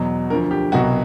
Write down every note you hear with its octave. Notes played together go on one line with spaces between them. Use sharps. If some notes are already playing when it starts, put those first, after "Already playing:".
Already playing: E2 B2 F#3
D2 D3 F3 A#4
G4
C2 B2 F#3 F#4